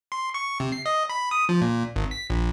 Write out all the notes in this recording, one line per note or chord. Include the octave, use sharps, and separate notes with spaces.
C6
C#6
C3
C7
D#5
B5
D#6
F3
A#2
G#1
B6
A#1